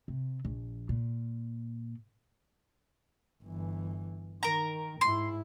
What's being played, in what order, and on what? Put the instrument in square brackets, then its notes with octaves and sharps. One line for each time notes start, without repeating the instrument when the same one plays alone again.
[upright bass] C3
A#1
A#2
[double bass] G1 E3
[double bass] D#3 [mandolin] A#4 A#5
[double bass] G#2 E4 [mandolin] C6